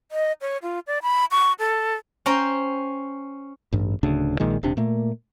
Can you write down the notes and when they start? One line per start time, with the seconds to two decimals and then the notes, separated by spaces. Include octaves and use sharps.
0.12 D#5
0.41 C#5
0.62 F4
0.87 D5
1.02 B5
1.31 C#6
1.59 A4
2.26 C#4 C5 G5 A#5
3.73 A1 G2
4.03 D1 D2 C#3 D4
4.40 A#1 A#2 D#3 G#3
4.63 D#1 C3 D4
4.77 A#2 A3 A#3